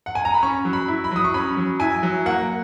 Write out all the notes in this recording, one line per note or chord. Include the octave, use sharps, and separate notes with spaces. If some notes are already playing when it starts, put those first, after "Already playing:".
F#5
G#5
A#5
B5
C#4 C#6
F#3
B5
E4
B5
F#3 D#6
C#6
C#4 B5
F#3
E4 G#5
F#3
A#3 F#5